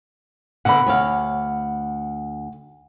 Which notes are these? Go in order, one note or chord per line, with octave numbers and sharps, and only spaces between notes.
B2 D3 A#3 F#5 B5
D2 C#5 F5